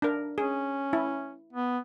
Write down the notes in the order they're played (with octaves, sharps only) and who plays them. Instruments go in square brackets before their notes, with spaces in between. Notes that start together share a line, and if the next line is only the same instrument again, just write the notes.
[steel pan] D4 A#4
[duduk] C#4 [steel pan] G#4
[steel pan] E4
[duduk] B3